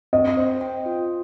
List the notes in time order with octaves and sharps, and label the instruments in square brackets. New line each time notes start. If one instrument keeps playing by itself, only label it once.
[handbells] C4 [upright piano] D#5
[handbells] C5
G5
F4